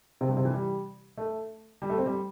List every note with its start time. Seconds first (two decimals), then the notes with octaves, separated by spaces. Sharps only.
0.21 C3
0.29 G2
0.37 C3
0.45 E3
0.54 G3
1.18 A3
1.82 G3
1.90 A3
1.98 C4
2.06 G3